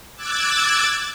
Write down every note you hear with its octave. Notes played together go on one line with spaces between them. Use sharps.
D6 E6 F#6 G#6 A6